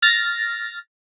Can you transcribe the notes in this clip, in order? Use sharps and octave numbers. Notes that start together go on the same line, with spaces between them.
F6 A6 A#6